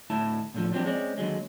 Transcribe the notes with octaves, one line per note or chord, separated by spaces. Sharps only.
D2 A2 E4 A5
A2 D3 F3
F3 F#3 C4 D4 G4
G#3 C4 C#4 C5 D5
D#2 D3 F#3 G#3